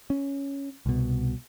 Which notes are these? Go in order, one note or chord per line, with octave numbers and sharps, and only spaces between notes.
C#4
C2 B2